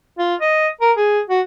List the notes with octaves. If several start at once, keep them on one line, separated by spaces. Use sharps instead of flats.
F4
D#5
A#4
G#4
F#4